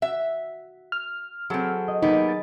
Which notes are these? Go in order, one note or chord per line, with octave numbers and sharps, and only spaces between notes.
F#4 E5
F6
F#3 C4 G#4 A4 B4
D#5
F#3 G3 A#3 B3 D#4 G#4 B4
A6